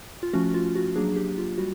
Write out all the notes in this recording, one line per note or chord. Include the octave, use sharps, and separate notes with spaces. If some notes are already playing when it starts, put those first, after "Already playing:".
F4
F3 A3 C#4 F#4
F4
F#4
F#3 A#3 D4 G#4
G4
F4
G3 F#4